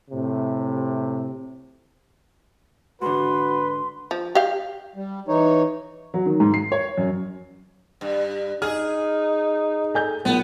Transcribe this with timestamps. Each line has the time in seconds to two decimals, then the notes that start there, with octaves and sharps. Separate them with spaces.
0.11 A2 C3
3.02 G#2 D3 F#4 B4 C6
4.11 F3
4.35 G4 F5
4.96 G3
5.28 E3 D#4 C#5
6.14 F#3
6.26 D#3
6.40 G#2
6.54 C7
6.72 C#5
6.97 F#2
8.01 G2
8.62 D#4 G#4 F6
9.94 A4 G#5 G6
10.25 B1 A#2 B3